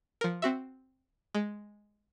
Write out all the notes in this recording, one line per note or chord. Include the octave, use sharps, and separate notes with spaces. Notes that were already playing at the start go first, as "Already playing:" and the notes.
F3 A#4
C4 F#4 E5
G#3